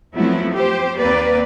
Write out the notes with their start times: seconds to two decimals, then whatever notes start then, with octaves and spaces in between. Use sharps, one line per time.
0.16 F3 F#3 A3 B3 C4 E4
0.53 G4 C5
0.99 D#2 A#3 C4 B4 D5